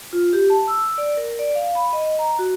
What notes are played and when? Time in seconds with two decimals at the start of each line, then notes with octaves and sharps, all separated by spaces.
0.13 F4
0.33 G4
0.50 A5
0.68 E6
0.98 D5
1.17 A#4
1.39 D5
1.55 F5
1.75 B5
1.93 D#5
2.19 A#5
2.39 F#4